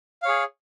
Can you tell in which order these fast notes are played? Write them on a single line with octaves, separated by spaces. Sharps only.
F5 C#5 G#4